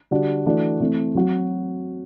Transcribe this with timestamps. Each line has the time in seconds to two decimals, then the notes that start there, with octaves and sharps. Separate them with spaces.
0.11 D3 G3 D4 F#4
0.45 E3 A3 D4 F#4
0.80 E3 A3 C4
1.15 F#3 C4 F#4